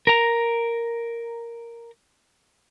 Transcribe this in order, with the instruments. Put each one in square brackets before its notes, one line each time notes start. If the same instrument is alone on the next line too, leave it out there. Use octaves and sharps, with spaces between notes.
[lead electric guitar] A#4 A#5